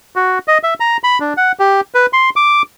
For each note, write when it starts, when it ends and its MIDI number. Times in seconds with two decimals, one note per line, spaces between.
0.16 0.39 66
0.48 0.58 75
0.63 0.74 76
0.80 0.97 82
1.04 1.19 83
1.20 1.33 62
1.37 1.52 78
1.59 1.81 67
1.94 2.06 71
2.13 2.30 84
2.36 2.62 86